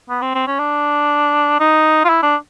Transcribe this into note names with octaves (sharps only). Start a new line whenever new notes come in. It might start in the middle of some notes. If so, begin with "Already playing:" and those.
B3
C4
C4
C#4
D4
D#4
F4
E4
D4